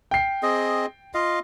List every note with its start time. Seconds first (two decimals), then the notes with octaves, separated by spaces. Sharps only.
0.11 G5 C7
0.43 C4 G#4 D#5
1.14 F4 D#5 F5